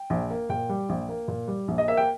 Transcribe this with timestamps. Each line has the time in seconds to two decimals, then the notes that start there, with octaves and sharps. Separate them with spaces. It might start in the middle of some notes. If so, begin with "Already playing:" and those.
Already playing: G5
0.10 A#1
0.30 A#3
0.49 A#2 G5
0.69 G3
0.89 A#1
1.09 A#3
1.28 A#2
1.48 G3
1.68 A#1
1.78 D#5
1.88 A#3 E5
1.97 G5